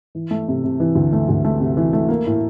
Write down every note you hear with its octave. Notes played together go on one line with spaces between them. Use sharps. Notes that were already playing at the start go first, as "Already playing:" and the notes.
E3
A3
C3
C3
E3
D2
A3
D2
A3
C3
E3
A3
A#3
A2